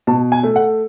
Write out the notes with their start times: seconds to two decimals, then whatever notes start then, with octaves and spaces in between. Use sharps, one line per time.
0.07 B2 A5
0.32 G#5
0.43 A3
0.56 F#5